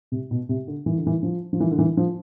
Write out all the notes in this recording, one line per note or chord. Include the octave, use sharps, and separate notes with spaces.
C3
B2
C3
D3
E3
D3
E3
F3
F3
E3
D3
E3
F3